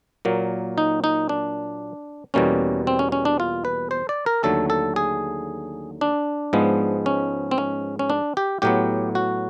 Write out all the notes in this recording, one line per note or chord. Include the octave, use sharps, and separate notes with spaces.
A#2 F#3 A#3
D#4
D#4
D4
E2 B2 G3 A#3 C#4
C4
C#4
C#4
D4
F4
B4
C5
D5
A#4
D#2 D3 F#3 A3 A4
A4
G#4
D4
G#2 F3 G#3 B3
C#4
C4
C#4
C#4
D4
G4
A2 F#3 B3 G4
F#4